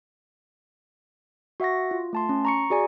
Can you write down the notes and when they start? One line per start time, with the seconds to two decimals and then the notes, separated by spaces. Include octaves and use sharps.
1.60 F#4 E5 F#5 C#6 A#6
1.91 F4
2.13 A3 A5 C6
2.29 C#4
2.45 A#5 C#6 C#7
2.70 F#4 G#4 D5 G#5 A#5